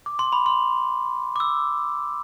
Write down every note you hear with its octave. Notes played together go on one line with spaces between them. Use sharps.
D6
C6
B5
C6
D6
E6